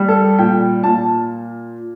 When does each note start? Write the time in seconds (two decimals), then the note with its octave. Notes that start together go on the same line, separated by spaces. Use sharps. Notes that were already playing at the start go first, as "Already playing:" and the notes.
Already playing: G3
0.08 A4
0.39 A#2 G5
0.83 A#2 A5